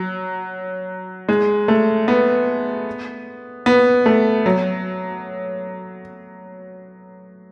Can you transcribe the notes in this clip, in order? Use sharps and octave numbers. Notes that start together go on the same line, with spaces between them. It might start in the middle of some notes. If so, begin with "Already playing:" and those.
Already playing: F#3
G#3
A3
B3
B3
A3
F#3